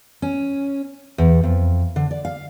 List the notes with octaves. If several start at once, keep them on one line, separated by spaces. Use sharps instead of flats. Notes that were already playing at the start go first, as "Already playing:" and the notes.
C#4
E2
F2
D3
D5
F5